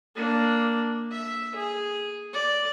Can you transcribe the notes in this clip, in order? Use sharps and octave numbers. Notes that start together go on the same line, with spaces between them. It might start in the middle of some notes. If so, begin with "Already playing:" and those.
A#3 D4
E5
G#4
D5